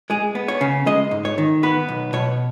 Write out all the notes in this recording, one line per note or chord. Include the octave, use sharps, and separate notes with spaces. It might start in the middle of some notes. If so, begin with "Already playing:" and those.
G#3 G#4
B3
C#5
C#3
G#3 D#5
G#2
C#5
D#3
B3 B4
B1
B2 C#5